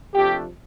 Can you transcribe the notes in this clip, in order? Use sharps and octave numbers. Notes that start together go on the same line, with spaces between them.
C3 F3 A3 D4 G4